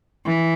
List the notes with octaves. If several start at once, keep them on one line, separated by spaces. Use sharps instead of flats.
E3